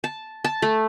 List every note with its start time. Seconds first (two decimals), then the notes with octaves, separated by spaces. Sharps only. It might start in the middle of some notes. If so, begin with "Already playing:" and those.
0.04 A5
0.44 A5
0.62 A3